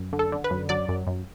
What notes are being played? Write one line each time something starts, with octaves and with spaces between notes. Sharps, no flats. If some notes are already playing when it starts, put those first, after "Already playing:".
Already playing: F#2
D3
A4
D3
B4
F#2
F#3 D5
F#2
F#2